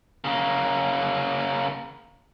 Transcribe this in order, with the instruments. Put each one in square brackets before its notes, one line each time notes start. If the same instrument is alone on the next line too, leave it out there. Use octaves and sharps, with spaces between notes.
[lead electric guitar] C#3 A#3